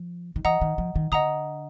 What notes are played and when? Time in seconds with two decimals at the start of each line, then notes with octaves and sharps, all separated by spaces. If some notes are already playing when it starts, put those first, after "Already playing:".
Already playing: F3
0.36 D#3
0.45 E3 D#5 F#5 A#5 D#6
0.61 D#3
0.78 F3
0.96 D#3
1.12 D3 D#5 F#5 A#5 D#6